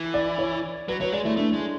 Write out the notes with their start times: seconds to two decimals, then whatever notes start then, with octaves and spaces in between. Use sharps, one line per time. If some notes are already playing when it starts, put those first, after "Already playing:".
Already playing: E3
0.14 D5
0.38 C#5
0.88 F#3 B4
1.00 F#3 C#5
1.12 G#3 D5
1.25 A3 E4
1.37 A3 D4
1.53 G#3